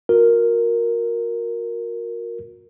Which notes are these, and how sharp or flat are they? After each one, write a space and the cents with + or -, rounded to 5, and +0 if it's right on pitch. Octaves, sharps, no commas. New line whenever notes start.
F#4 -40 A#4 +0